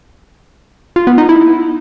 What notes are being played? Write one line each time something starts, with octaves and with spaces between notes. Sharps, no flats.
F4
B3
D#4
E4